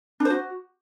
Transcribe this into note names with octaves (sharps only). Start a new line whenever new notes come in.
D4
C5
F#4